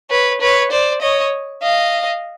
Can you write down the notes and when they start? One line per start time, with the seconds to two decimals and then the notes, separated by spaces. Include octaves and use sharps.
0.11 B4 C#5
0.40 B4 C#5
0.71 C5 D5
1.02 C#5 D#5
1.62 D#5 F5